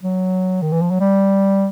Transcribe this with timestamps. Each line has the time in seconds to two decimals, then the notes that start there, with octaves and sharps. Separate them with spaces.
0.03 F#3
0.62 D#3
0.72 E3
0.82 F3
0.90 F#3
1.00 G3